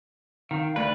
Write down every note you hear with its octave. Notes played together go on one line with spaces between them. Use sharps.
D#3 F5
D2 B4 D5 F#6